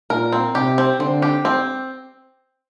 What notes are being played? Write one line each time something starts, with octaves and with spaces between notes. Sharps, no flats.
A#2 A#4
C4
C3 G4
C4
D3 C4
G4
C4